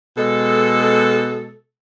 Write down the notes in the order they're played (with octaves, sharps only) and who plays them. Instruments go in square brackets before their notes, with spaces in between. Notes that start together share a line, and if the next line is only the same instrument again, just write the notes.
[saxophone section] B2 G#3 A4